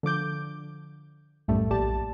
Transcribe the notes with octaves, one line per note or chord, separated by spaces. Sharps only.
D3 F3 D6 G6
B1 F#2 A2 G3 A3
A#1 G4 D5 A5